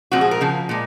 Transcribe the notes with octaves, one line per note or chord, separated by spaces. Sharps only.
A#2 F3 G#3 C4 F#4
G#4
A#4
C#3 F3
A#2 G#3